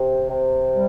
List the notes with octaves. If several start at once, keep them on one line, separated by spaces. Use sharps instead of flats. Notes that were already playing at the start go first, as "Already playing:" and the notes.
Already playing: C3
C3
G3